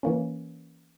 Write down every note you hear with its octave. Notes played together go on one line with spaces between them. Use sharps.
E3 A#3 C#4